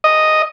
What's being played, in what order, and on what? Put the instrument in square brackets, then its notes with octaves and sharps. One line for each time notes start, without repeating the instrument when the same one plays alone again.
[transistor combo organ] D#5